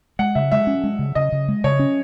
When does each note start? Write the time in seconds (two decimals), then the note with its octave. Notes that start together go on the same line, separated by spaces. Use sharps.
0.19 G#3 F#5
0.35 C#3 E5
0.52 G#3 E5
0.67 C#4
0.84 G#3
0.99 C#3
1.15 C#3 D#5
1.32 C#3
1.48 G#3
1.64 C#3 C#5
1.79 C#4